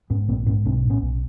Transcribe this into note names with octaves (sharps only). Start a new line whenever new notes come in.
G#2 B3 C#4
A#1 A#3 C4
G#2 B3 C#4
B1 C4 D4
A2
B3 C#4
B1